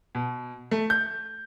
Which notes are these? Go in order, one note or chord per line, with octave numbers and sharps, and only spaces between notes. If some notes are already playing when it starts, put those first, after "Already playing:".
B2
A3
G6